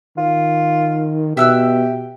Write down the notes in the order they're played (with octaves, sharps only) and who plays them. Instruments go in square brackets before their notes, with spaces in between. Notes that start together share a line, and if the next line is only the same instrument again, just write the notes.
[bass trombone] D#3 [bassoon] F4
[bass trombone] B2 [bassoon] G4 [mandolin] E5 E6 F#6